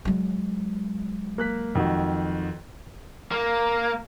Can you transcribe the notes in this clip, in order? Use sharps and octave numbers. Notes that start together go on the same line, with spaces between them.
F#3 G#3
A#3 F#6 B6
F2 D#3 F#4
A#3